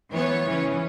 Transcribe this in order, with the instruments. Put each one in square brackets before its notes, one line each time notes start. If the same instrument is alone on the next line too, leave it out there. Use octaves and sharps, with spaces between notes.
[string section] E3 B3 C#5
C#3 E3 C#4